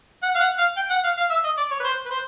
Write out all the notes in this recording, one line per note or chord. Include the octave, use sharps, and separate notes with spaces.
F#5
F5
F#5
F5
G5
F#5
F5
F5
E5
D#5
D5
C#5
B4
C5
B4
C5